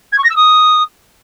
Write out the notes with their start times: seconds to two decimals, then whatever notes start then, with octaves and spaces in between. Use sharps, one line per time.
0.12 G#6
0.18 C#6
0.24 A#6
0.30 E6
0.36 D#6